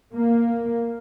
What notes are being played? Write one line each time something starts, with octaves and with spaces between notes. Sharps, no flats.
A#3